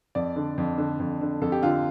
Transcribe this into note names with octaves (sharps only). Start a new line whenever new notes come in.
F2 D5
D3
F2
D3
F2
D3
F2 A4
G4
D3 F4